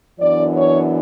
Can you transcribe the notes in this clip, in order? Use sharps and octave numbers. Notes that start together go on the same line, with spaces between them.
F#2 E3 B3 D4 D5
C#5